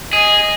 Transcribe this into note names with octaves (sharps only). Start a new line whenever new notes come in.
G#4 D#5